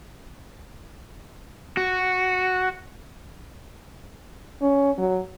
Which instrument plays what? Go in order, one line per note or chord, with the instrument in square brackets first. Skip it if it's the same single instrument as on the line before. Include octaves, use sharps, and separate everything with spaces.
[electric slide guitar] F#4
[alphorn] C#4
F#3